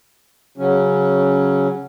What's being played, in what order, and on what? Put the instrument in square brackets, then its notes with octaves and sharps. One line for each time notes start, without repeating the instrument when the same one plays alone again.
[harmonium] C#3 F#3 C#4